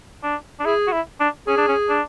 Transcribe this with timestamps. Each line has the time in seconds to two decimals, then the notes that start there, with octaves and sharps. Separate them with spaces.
0.23 D4
0.60 D4
0.65 E4 G#4
0.87 F#4
0.92 E4
1.20 D4
1.48 C#4 G#4
1.57 D4
1.68 C#4
1.89 D4